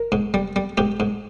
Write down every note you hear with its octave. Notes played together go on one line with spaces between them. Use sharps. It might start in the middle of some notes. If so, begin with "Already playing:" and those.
Already playing: A#4
G#2
G3
G3
G#2 G4
G#2